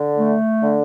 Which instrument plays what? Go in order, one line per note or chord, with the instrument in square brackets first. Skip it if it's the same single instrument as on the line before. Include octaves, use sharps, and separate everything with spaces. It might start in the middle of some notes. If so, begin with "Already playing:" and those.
Already playing: [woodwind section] D3
A3
D3